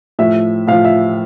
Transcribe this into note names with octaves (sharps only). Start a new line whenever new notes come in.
A2 F3 E5
A2 F3 F5
E5